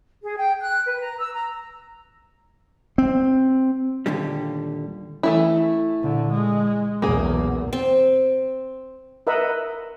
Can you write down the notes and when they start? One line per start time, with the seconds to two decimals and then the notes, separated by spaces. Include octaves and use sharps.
0.24 G#4
0.37 G5
0.61 F#6
0.85 B4
1.01 A#5
1.18 E6
1.33 A#5
2.98 C4
4.06 D#2 A#2 D3 G3
5.23 E3 A3 E4
6.01 A#2 D3
6.33 G#3
7.02 B1 E2 A#3 G#4
7.73 C4
9.27 A#4 B4 D#5 E5 F#5 B5